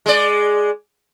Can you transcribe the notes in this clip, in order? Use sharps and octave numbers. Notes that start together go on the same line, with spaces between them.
G#3 D5